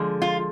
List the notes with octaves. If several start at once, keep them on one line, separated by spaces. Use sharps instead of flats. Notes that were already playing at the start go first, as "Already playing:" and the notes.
Already playing: D3 F3 G#3
F4